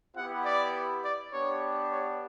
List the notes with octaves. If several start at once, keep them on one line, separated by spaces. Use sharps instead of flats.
B3 E4 G4 F#5
D5
D5
B3 D4 G4 C#5
C#5